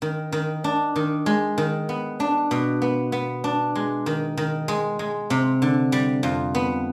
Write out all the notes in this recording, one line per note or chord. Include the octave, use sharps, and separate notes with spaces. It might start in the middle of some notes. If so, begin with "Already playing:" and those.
D#3
D#3
D4
D#3
G#3
D#3
B3
D4
B2
B3
B3
D4
G#3
D#3
D#3
G#3
G#3
C3
D3
G3
F2
B3